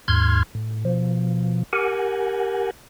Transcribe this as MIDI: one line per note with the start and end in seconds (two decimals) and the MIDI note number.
0.08 0.43 39
0.08 0.43 44
0.08 0.43 84
0.08 0.43 89
0.08 0.43 92
0.55 0.84 45
0.85 1.63 47
0.85 1.63 53
1.73 2.71 67
1.73 2.71 70
1.73 2.71 78
1.73 2.71 80